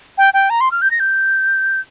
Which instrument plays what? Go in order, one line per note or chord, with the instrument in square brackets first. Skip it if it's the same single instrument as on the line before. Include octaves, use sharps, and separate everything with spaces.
[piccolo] G5
G5
A#5
C6
F6
G6
A#6
G6